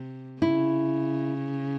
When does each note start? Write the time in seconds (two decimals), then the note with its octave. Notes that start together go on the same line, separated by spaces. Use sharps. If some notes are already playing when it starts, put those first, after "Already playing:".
Already playing: C3
0.41 C#3 E4